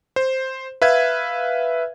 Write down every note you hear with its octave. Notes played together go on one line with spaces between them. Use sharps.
C5
B4 E5 F5 G#6